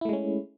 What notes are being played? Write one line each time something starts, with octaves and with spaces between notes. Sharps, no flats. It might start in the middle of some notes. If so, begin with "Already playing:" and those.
G#3 A3 C#4 E4